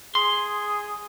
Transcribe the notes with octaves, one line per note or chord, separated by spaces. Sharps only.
G#4 C6